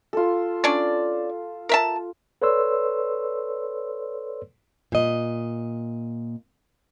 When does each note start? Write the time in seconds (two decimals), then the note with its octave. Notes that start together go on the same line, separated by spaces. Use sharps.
0.13 F4 A4
0.64 C#4 D4 D5
1.69 A#4 E5 A5
2.42 A4 B4 C#5 D5 C6 E6
4.92 A#2 D#5